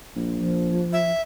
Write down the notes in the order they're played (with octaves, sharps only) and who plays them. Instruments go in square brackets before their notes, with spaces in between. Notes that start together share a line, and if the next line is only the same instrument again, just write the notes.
[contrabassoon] A#1
[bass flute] F3
[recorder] E5